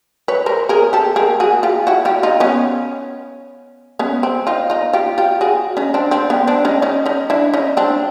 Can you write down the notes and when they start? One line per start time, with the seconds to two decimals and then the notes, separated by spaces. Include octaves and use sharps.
0.28 B4 C#5
0.46 A#4 C5
0.69 G#4 A#4
0.93 G4 A4
1.16 G#4 A#4
1.40 F#4 G#4
1.63 F4 G4
1.87 E4 F#4
2.05 F4 G4
2.23 D#4 F4
2.40 B3 C#4
3.99 B3 C#4
4.23 C4
4.47 D#4 F4
4.70 D#4 F4
4.93 F4 G4
5.18 F4 G4
5.41 F#4 G#4
5.77 C#4 D#4
5.94 C4 D4
6.11 C4 D4
6.30 B3 C#4
6.47 C4 D4
6.65 C#4 D#4
6.82 C#4 D#4
7.06 C#4 D#4
7.30 D4 E4
7.54 C#4 D#4
7.77 C4 D4